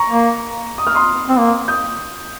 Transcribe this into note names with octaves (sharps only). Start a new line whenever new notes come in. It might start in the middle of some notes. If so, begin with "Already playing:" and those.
Already playing: A#5 C#6
A#3
D#6
F6
C6 D#6
C4
A#3
D#6 G6